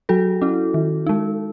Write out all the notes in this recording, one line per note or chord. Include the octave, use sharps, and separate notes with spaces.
F#3 F#4 A4
C#4 E4
D#3
G#3 D#4